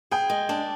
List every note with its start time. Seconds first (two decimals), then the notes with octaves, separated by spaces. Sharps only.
0.11 G#4 G5
0.30 G#3
0.49 D4